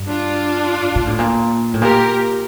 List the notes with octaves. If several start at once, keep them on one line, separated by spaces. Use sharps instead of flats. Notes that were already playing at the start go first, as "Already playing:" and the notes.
Already playing: G2
D4 F4
A#2
A2
A#2
A2
A#2 G4 A#4